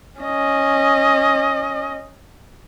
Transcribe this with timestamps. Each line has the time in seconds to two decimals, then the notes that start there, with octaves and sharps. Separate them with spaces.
0.20 C#4 D#5